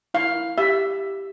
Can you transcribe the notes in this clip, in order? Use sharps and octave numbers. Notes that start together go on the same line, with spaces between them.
E4 F5
E4
G4 E5